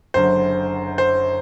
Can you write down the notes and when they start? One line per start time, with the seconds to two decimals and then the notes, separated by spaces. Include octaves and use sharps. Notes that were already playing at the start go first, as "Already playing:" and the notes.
0.14 F#1 F#2 D3 C5
0.98 C5